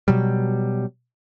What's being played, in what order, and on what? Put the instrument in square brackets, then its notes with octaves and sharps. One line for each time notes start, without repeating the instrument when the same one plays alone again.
[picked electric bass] B2 F#3 G3